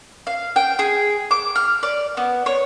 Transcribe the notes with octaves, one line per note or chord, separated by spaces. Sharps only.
F5
G5
G#4
D6
F6
D5
B3
C#5